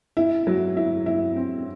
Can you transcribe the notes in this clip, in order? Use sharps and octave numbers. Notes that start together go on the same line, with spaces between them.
E4
F#3
E4
E4
C4